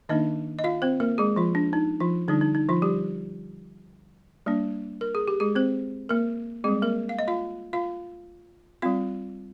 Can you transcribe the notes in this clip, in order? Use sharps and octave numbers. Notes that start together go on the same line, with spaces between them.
D#3 A#3 D4 D#4 D#5
D#5
F4 F5
C4 C5
A#3 A#4
G#3 G#4
F3 F4
D4
D#4
F3 F4
D3 G3 D4 D#4
D#4
D#4
F3 F4
G3 G4
G3 A#3 D4
A#4
G#4
G4
G#3 G#4
C4 C5
A#3 A#4
G3 G#3 C4 G#4
A#3 A#4
F5
D#5
F4 F5
F4 F5
G3 C4 F4 F5